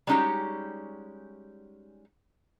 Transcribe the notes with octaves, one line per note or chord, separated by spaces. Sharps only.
G3 G#3 C#4 D#4 F#4 G4